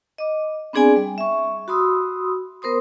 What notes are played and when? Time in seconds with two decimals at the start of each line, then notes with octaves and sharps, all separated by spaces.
0.18 D#5 D6
0.73 B3 C4 D4 G#4 D5 G#5
0.96 G3
1.18 E5 C#6
1.68 F#4 B5 C6 D#6 E6
2.62 B3 A#4 C5 C6 D#6